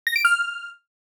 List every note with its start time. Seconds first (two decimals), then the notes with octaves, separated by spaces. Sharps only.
0.07 A#6
0.16 D7
0.25 F6